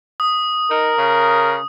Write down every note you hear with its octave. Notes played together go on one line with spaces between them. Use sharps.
D#6
D#4 A#4
C#3